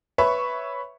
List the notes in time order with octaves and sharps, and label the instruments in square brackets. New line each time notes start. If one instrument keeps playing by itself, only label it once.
[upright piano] B4 C#5 E5 B5 C#6